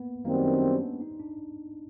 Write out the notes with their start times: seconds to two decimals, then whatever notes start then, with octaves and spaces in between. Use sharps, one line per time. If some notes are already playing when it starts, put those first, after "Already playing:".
Already playing: A#3 B3
0.25 F#2 D#3 G3 A#3 C4
0.34 B3
0.43 C#4
0.53 D4
1.01 D#4
1.20 D4